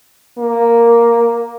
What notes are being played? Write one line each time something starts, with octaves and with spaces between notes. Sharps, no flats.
A#3